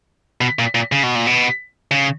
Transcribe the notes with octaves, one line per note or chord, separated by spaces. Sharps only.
B2
A#2
A#2
C#3
B2
A#2
B2
C#3